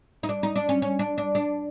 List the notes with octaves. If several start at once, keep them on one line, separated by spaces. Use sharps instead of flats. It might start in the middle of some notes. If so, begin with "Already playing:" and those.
D#4
D4
D#4
D4
C#4
C#4
D4
D4
D4